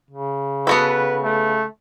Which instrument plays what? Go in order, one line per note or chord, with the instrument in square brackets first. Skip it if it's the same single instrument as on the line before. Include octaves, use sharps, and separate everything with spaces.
[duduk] C#3
[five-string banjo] B3 F#4 A4 [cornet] B4
[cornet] A3